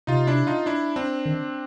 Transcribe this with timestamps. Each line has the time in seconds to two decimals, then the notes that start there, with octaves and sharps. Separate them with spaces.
0.07 C3 D#4 F4
0.27 D4 E4
0.47 D#4 F4
0.66 D4 E4
0.96 C4 D4
1.25 D#3